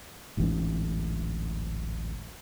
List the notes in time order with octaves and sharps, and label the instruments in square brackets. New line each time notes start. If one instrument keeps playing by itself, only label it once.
[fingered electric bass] D1 A1 G#2 C#4